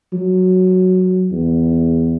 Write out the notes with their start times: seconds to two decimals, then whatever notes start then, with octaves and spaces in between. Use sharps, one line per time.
0.13 F#3
1.32 E2